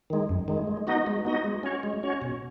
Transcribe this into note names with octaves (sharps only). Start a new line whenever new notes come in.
D#3 G#3
F#2
D#3 G#3
G#3
B3 D#4 F#4 D#5
G#3
B3 D#4 F#4 D#5
G#3
C#4 F#4 C#5
G#3
C#4 F#4 C#5
B2